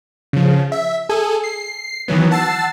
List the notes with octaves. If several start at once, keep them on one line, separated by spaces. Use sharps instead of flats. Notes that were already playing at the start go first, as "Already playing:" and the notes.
C#3 F3
E5
G#4 A4 G#5
C7
D#3 E3 F#3 B3
F#5 A5 E6 A6 C7